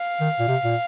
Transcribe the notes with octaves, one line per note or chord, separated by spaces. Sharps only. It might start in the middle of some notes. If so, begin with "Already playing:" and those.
Already playing: F5
D#3
A#2
C3
A#2